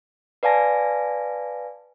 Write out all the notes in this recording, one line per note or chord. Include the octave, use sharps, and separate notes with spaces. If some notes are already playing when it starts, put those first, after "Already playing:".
B4 D5 F5 G#5 A5 A#6